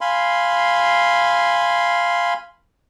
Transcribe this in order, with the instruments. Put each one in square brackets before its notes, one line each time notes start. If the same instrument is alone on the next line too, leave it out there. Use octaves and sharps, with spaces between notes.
[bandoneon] F5 G#5 B5 C6